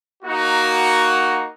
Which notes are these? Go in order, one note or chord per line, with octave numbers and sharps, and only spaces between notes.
A#3 D#4 F#4